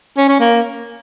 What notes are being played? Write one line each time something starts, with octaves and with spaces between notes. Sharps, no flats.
C#4
C#4
A#3